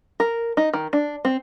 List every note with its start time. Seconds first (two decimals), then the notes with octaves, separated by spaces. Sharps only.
0.20 A#4
0.57 D#4
0.73 D#3
0.93 D4
1.25 C4